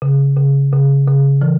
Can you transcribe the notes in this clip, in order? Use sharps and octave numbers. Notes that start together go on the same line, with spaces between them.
C#3
C#3
C#3
C#3
E3